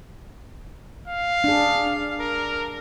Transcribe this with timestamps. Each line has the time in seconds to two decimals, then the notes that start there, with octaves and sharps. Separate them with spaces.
1.07 F5
1.44 D4 G#4
2.19 A#4